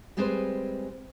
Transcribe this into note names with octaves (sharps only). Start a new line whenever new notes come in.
G3 G#3 C4 G#4 B4 C5